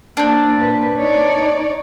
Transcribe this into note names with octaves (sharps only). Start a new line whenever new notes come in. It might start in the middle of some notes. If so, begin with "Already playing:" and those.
A#3 C4 D4
A#2 B4
D#4 C#5 D5